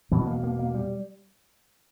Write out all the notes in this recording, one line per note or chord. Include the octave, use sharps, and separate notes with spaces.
E2 B2 E3
A#3
A#3
A#3
G3